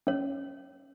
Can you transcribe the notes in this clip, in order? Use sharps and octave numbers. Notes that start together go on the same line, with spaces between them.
C#4 C#5